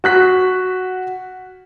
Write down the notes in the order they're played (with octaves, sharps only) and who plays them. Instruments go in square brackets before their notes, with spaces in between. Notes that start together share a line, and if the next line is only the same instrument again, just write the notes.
[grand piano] F#4 F#6 B6